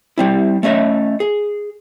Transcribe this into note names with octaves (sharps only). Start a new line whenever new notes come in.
G3 C4 E4
A3 C#4 D#5 E5
G#4